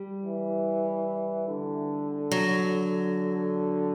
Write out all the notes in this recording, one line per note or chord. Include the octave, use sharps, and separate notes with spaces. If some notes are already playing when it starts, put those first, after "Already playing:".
Already playing: G3
E3
D3
F#3